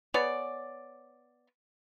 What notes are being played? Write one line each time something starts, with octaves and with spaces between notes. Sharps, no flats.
B3 G#4 C#5 D5